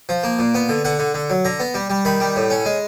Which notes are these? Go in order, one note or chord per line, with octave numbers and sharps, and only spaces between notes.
F3
A#3
A#2
B3
D3
D3 F#5
D3
D3
F#3
D3 A#5
B3
G3
G3
D#3 B5
G3
A2
C#4
G#3